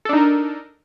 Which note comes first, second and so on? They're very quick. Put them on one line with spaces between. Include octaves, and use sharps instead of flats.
A4 D4 D#4 A#4